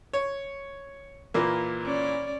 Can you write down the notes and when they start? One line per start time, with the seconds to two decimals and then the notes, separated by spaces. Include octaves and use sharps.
0.13 C#5
1.34 A#2 E3 A#3
1.82 C#4 D5